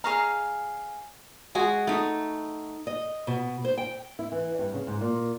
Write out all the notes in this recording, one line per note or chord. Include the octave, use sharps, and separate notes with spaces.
G#4 C#5 F5 A#5
G#3 F#4 G#4
A3 D#4
D#5
B2
C5
G5
E4
E3
G2
C#3
G#2
A#2